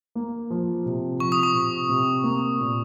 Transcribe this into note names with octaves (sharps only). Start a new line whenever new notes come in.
A#3
F3
C3
F3 C#6
D#6
C#6
C3
C3
A#3
A#2